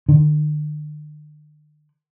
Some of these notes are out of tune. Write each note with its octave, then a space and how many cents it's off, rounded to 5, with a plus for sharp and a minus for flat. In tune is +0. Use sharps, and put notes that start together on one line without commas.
D3 +45